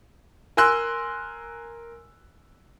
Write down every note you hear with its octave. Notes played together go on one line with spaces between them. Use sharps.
A#4 G#5 C6 E6 F#6